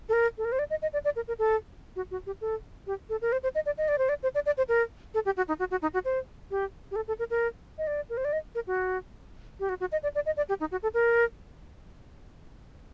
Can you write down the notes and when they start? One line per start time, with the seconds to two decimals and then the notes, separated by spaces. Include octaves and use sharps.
0.09 A4
0.13 A#4
0.38 A4
0.45 A#4
0.52 C5
0.59 D5
0.70 D#5
0.82 D#5
0.93 D5
1.05 D5
1.16 A#4
1.28 A#4
1.39 A4
1.96 F#4
2.11 F#4
2.26 G4
2.41 A4
2.87 G4
3.10 A4
3.22 A#4
3.32 C5
3.43 C5
3.55 D#5
3.66 D5
3.78 D#5
3.88 D5
3.98 C5
4.09 D5
4.23 C5
4.35 D5
4.46 D5
4.57 C5
4.69 A#4
5.14 A4
5.25 G4
5.37 F#4
5.48 D#4
5.59 F#4
5.71 F#4
5.82 D#4
5.94 F#4
6.05 C5
6.51 G4
6.91 G4
6.96 A4
7.08 A4
7.19 A#4
7.30 A#4
7.78 D#5
7.87 D5
8.10 A#4
8.17 C5
8.25 D5
8.33 D#5
8.55 A#4
8.67 F#4
9.60 G4
9.69 F#4
9.80 F#4
9.92 D#5
10.03 D5
10.15 D5
10.26 D#5
10.37 D5
10.49 G4
10.60 D#4
10.71 F#4
10.83 A4
10.94 A#4